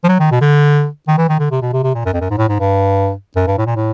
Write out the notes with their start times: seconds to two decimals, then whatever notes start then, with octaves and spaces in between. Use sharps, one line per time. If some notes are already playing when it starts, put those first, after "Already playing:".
0.04 F3
0.09 F#3
0.19 D#3
0.31 B2
0.41 D3
1.08 D#3
1.18 E3
1.29 D#3
1.39 D3
1.51 C3
1.62 B2
1.73 C3
1.83 C3
1.95 A#2
2.06 F#2
2.13 F2
2.21 F#2
2.30 G#2
2.38 A2
2.49 G#2
2.59 G2
3.36 F#2
3.47 G2
3.58 A2
3.67 A#2
3.76 A2